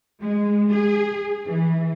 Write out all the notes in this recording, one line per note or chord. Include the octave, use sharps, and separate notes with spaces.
G#3
G#4
E3